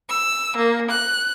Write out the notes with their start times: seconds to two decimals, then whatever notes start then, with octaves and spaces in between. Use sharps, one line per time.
0.11 E6
0.59 A#3
0.92 F#6